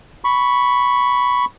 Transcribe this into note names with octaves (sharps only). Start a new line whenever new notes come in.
B5 C#6